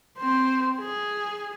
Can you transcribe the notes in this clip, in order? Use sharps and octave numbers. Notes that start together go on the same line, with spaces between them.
C4 C5
G#4